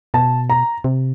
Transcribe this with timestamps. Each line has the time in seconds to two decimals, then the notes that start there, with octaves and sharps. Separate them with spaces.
0.14 B2 A5
0.50 A#5
0.84 C3